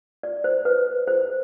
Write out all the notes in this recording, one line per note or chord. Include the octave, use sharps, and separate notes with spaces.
D5
C5
B4
C5